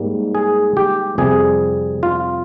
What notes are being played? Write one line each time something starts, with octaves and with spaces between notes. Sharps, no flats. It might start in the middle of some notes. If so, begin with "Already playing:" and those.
Already playing: G#2 G3 A#3
G#4
G4
F2 C3 G3 G#4
F4